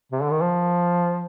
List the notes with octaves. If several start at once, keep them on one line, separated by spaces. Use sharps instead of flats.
C3
D3
D#3
F3